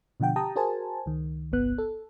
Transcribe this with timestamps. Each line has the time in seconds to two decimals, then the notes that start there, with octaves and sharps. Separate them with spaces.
0.20 B2 D3 F3 F#5 G5
0.36 G4 G5 A5 A#5 D#6
0.56 F#4 G#4 A#4 C5 G#5 A5
1.06 C#2 D#3
1.52 G1 C2 B3 F#6
1.78 A4